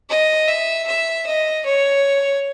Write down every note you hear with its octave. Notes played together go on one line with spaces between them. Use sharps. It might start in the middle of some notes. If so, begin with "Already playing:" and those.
D#5
E5
E5
D#5
C#5